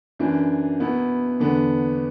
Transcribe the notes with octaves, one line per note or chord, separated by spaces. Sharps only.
F#2 E3 D4
B2 B3 E4
E2 D3 B3 D4